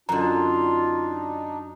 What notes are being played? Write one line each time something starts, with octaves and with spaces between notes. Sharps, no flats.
F#2 D3 D4 D#4 F4 A#5